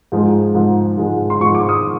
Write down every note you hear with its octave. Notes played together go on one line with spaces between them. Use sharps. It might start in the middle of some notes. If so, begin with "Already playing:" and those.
G#2 F3 G#3
G#2 F3 G#3
G#2 F3 G#3
C6
G#2 F3 G#3 C#6
D6
D#6